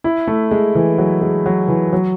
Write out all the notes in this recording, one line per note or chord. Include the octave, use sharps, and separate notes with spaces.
E4
A3
G#3
E3
F#3
G#3
F#3
E3
F#3